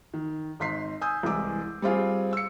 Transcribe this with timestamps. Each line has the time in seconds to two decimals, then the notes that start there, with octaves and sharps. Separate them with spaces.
0.14 D#3
0.60 G#1 D#4 C6 B6 C7
1.01 G#5 D#6 E6 G6
1.23 C2 E3 G#3 D6 E6
1.82 G3 C4 F4 G#4
2.33 E6 C#7